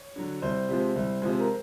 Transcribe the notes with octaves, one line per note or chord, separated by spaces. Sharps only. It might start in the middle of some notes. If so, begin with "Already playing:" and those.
Already playing: C#5
D3 F#3
C2 C5
C3 F3 G#3
C2
C3 F3 G#3
A#4